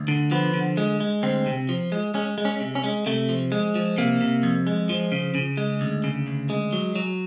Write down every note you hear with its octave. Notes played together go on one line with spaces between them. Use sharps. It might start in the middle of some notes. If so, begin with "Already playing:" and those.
Already playing: D2
D3
F3 B3
D3
G#3
G#3
D2 C4
C3
F3
G#3
G#3 C#4
G#3
C#4
C3
C#4
G#3
C3 A3
F3
G#3
F3
C3 A#3
C3
F2
G#3
F3
C#3
C#3
G#3
D2
C#3
D2
G#3
F#3
F#3